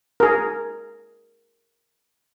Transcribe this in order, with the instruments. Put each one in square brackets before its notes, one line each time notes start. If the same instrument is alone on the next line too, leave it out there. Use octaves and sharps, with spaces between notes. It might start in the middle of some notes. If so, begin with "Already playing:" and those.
[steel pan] G#4 A#4